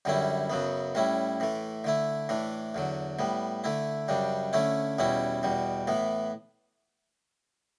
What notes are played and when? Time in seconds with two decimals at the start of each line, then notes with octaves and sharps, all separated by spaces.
0.05 F#2 D3 G3 C#4 E4
0.50 F#2 C#3 F#3 B3
0.95 A2 G3 C#4 E4
1.40 A2 E3 A3
1.84 D3 A3 E4
2.29 A2 E3 A3 D4
2.75 E2 D3 F#3
3.19 A2 G3 B3
3.64 D3 A3 E4
4.08 F#2 C#3 G3 D4
4.53 D3 A3 C#4 E4
4.99 E2 B2 G3 C#4 E4
5.43 E2 B2 G3
5.87 A2 E3 B3